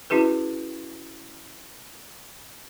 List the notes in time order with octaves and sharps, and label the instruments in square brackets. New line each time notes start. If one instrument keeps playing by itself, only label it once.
[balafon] C#4 E4 F#4 G#4 B4